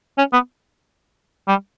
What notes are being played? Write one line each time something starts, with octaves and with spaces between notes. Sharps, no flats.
C#4
B3
G3